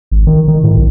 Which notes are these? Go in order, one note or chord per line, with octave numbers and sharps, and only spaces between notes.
G#1
D#3
D#3
A2
B1